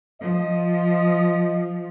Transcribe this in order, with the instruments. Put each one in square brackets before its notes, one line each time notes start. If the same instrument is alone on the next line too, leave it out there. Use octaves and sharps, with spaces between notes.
[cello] F3 [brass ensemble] D#5